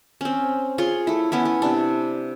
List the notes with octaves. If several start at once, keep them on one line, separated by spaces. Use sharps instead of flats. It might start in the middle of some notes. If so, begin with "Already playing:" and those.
C4 C#4
F4 G#4 C#5 C6
A3 E4
B3 C#4 E4
B3
C3 D4